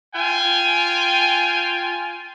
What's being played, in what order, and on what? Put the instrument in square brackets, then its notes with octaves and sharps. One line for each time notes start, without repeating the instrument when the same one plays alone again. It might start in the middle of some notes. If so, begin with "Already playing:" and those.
[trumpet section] F4 G5 G#5